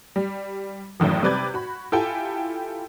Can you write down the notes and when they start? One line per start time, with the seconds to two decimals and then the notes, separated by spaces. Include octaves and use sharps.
0.16 G3
1.00 G#1 F#2 A2 D#3 E3
1.23 C3 G3 B4 D5 G6 G#6
1.54 F#4 B5
1.92 E4 F4 G4 A4 G5 G#5